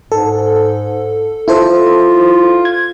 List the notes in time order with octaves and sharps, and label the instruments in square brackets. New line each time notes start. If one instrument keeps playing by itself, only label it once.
[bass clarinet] G#2 [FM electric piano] A4
[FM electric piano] E4 A4 C5 [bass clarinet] F4
[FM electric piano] G#6